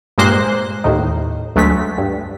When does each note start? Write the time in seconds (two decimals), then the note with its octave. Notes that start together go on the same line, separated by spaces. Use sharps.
0.18 G2 A#2 G#3 A#3 C5 F#6
0.84 D#2 A2 D#3
1.56 D2 F#3 G#3 A3 B6
1.98 G2